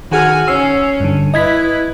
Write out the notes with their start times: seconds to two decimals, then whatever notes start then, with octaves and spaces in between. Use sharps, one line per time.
0.12 D#3 F#4 G#4 G#5 F6
0.48 C#4 E6 C7
1.00 G2 D3
1.34 E4 B4 D#5 G#6 B6